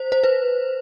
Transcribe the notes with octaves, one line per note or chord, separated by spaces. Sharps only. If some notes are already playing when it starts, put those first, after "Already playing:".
Already playing: C5
C5
B4